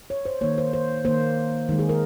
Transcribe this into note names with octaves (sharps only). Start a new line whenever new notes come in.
C#5
C5
D#3 A#3 C#5
C5
C5
D#3 A#3 C5
D#3 G#3
G#4
A#4